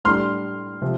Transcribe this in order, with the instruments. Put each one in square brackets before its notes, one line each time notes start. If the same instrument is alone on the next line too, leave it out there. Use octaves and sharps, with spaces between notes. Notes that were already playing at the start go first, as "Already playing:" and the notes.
[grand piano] A2 G3 D4 C6 F6
C3 F3